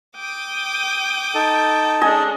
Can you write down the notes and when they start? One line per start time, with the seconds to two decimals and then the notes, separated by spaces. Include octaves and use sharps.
0.16 G5 D6 D#6
1.35 D#4 A4
2.01 G#3 C#4 D4 D#5 G#5